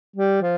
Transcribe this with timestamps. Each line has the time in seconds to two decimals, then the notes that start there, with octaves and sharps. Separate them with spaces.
0.16 G3
0.42 F3